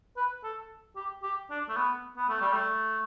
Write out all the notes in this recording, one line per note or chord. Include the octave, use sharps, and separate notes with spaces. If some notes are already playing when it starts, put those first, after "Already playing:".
B4
A4
G4
G4
D4
A3
B3
B3
A3
G3
A3